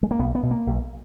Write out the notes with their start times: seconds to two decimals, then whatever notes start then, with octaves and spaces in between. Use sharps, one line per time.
0.03 G#3
0.11 A#3
0.19 B1 B3
0.35 B3
0.43 B2
0.51 A#3
0.67 B1